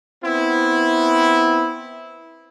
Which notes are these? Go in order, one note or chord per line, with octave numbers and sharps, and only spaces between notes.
B3 C4 E4